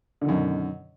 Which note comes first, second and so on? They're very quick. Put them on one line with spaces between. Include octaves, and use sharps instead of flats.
D3 D#3 F#2 B2